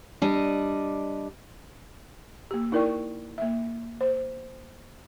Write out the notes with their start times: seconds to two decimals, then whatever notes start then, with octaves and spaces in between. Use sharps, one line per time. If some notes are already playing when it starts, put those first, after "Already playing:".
0.22 G3 D4 D#5
2.51 A#3 G4
2.72 D#4 E4 A#4 D5 G5 C#6
3.38 A#3 E5
4.01 C5